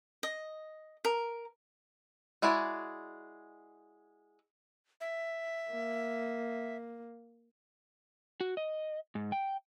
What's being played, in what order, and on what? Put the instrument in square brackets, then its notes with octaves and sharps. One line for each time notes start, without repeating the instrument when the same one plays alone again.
[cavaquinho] D#5
A#4
[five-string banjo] G#3 E4 F#4 G#4 D5
[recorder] E5
[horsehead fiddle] A#3
[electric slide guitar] F#4
D#5
G#2
G5